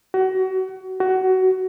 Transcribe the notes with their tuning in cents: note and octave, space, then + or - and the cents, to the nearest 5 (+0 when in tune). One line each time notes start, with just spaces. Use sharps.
F#4 +30
F#4 +20